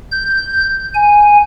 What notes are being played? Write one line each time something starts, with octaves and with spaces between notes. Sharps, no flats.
G6
G#5